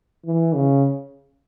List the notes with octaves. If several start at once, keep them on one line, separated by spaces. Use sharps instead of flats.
E3
C#3